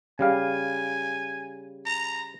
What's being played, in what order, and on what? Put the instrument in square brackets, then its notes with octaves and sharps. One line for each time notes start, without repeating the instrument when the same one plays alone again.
[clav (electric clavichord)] C#3 G3 F5 [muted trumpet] G#5
[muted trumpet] A#5